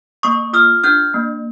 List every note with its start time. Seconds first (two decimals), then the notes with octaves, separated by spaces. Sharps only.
0.23 A#3 C#6 D#6
0.53 F4 D#6 F6
0.84 D4 F6 G6
1.14 A#3